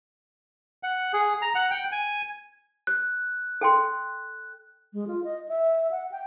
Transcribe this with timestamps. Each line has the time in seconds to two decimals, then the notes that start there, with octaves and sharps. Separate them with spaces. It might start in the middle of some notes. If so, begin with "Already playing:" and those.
0.83 F#5
1.13 G#4
1.42 A#5
1.55 F#5
1.71 G5
1.92 G#5
2.87 F#6
3.61 A4 G5 C6
4.93 G#3
5.07 F4
5.24 D#5
5.49 E5
5.91 F#5
6.11 G5